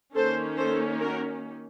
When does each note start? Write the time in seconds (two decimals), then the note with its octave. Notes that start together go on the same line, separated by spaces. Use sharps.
0.15 D#3 A#3 C#4 A4 C5
0.57 A4 C5
1.00 F#4 A#4